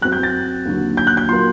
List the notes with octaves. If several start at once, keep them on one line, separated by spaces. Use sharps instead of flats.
F#2 F#3 C4 F#6
G6
A6
D#2 D3 F#3
G6
F#6
G6
A#2 F#3 A#3 C6